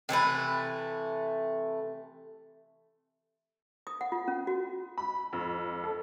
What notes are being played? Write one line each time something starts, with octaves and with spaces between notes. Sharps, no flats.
C3 E3 A3 B4
D#6
F#5
F4
C#4
F#4
B5
F2
A4